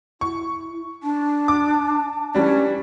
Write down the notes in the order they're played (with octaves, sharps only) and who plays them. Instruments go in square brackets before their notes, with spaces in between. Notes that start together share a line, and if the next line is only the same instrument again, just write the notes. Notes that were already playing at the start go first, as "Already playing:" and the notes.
[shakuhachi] E4 [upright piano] C#6
[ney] D4 [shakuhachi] A5
[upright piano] D6
[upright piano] E3 G3 D4 [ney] C#4